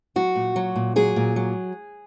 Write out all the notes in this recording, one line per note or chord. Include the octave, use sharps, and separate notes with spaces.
F#3 F#4
A#2
F#3
A#2
F#3 G#4
A#2
F#3